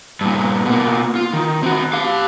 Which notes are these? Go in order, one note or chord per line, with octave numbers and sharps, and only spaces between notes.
G2 A#2
B2 A#3
F4
D#3
C4 F#4
G4 F5